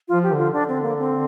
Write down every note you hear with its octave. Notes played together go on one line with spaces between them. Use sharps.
F3 F4
G4
D3 F4
D3 D4
C4
A#3
C4